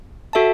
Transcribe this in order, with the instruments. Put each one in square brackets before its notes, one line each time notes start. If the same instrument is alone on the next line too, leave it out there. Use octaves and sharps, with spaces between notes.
[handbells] F#4 A4 E5 A5